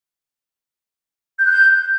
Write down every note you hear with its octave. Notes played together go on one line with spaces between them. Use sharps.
G6
F#6
G6